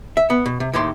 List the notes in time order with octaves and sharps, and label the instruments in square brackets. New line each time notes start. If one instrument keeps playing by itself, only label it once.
[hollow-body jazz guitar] E5
B3
B2
C3
D#2 A2 D#3 G4 C6